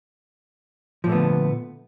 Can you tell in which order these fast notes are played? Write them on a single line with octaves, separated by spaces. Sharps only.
F3 A#2 A3 B3 D3